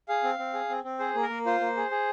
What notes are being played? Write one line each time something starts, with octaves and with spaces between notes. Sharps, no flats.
G#4 F5
C4
C4
G#4
C4
C4
G#4 C5
A#3
A#4
A#3
F4 C5
A#3
G#4
G#4